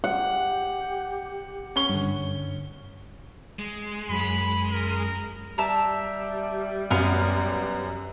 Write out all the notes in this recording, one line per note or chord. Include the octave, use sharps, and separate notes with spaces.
G4 F#5
C#4 C#6 G7
G2 D3
G#3
F#2 B5
A#4
G3 E5 A5 A#5
F#2 B3 F5